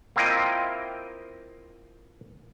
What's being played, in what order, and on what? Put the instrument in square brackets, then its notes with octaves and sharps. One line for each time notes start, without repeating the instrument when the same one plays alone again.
[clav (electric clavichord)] A#3 C4 E4 F4 D#5 G5